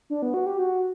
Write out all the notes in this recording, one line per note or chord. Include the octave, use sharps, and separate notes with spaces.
D4
B3
F#4
G4
F#4